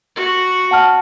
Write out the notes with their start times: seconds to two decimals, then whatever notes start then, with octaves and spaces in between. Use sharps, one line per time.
0.16 F#4
0.71 F#5 A5 F6